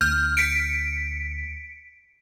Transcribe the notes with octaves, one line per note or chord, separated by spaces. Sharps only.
D2 F6 G6
B6 C#7 D7